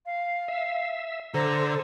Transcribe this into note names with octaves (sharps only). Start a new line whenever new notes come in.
F5
E5
D3 A4 C5 A#5